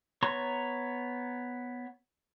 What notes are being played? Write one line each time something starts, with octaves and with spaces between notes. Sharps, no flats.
B3 C#5 A#5 C6 C#6